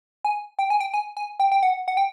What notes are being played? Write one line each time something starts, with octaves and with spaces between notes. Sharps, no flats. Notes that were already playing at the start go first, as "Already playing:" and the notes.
G#5
G5
G#5
G5
G#5
G#5
G5
G5
F#5
F#5
G5